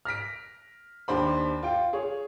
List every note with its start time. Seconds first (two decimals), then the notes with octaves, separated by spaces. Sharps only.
0.05 F6 A#6 B6 D7
1.08 D#2 D4 C5 B5
1.63 F4 G5
1.93 G#4 C#5